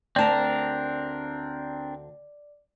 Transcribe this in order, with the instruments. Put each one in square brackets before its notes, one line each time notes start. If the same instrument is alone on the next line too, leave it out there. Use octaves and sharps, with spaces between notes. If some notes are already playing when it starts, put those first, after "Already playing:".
[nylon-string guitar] D2 A5 [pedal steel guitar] C4 D4 A#4 [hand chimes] D5